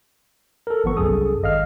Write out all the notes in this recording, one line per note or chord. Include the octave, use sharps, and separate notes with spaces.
A4 A#4
G#1 F3 B3 C#6
C2 F#2 G#4 A4 D#6
G#1 D#5 F5 F6